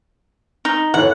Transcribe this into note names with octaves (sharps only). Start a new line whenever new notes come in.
D#4
E3 A4 C#5 F#5